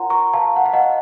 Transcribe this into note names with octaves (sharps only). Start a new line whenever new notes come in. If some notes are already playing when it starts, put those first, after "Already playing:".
Already playing: F4 A#4 C#5 F#5 A#5 C6
A#5 C#6
F5 A5
F#5
F5
D#5 F#5